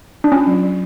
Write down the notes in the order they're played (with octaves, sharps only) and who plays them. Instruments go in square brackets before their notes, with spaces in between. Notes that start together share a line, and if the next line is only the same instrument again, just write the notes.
[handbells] D4
[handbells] C#4 [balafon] F4
[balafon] F#3
F#3